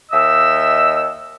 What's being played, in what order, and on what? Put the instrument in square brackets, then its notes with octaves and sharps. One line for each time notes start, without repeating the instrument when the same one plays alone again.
[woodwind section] D#2 D#5 E5 E6